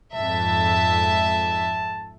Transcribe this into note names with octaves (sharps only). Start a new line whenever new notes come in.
F2 G#2 E5 A5